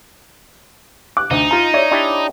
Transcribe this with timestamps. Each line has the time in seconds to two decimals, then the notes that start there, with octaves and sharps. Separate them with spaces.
1.17 D6 F#6
1.31 D2 D#4
1.51 F4 A#5
1.74 C#5 D5 E5
1.91 D4 E4 G4